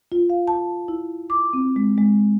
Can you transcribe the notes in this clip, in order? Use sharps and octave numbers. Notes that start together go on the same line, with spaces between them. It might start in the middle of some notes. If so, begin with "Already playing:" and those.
F4
F5
A5
E4
D6
C4
G#3
G#3